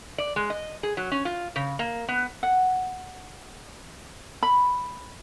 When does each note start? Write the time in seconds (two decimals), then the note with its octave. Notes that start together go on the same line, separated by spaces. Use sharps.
0.18 D5
0.36 G#3
0.50 D#5
0.83 G#4
0.97 F#3
1.12 C#4
1.25 F4
1.56 C#3
1.79 A#3
2.08 B3
2.43 F#5
4.43 B5